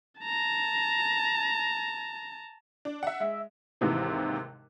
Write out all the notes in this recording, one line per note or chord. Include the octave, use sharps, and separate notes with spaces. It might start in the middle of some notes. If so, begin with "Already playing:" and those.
A5 A#5
D4
E5 F#5
G#3 E5
D#2 G#2 C3 E3